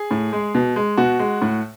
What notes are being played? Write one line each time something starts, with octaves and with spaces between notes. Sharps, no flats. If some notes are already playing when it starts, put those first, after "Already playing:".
Already playing: G#4
A2
G#3
B2
G#3
B2 F#4
G#3
A2